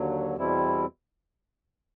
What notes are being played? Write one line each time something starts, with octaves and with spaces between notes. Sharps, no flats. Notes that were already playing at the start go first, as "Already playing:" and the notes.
Already playing: D#2 D3 F#3
E2 B2 G3 C4 E4